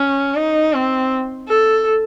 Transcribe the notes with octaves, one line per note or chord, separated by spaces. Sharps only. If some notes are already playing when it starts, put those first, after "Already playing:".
Already playing: C#4
D#4
C4
A4